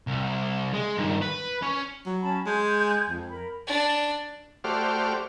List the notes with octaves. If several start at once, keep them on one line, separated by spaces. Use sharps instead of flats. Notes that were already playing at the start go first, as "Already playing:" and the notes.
C2
G#3
G2 D#3
B4
C#4 C#5
F#3
C#4 A5 B5
G#3 G#5 G6 G#6
F2
A#4 B5
D4
A3 F#4 G4 C5 D5 F6